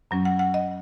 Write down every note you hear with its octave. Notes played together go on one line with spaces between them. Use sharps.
F#2 F#3 C#4
F#5
F#5
D#5